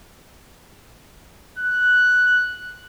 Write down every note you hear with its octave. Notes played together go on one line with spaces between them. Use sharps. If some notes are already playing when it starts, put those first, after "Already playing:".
F#6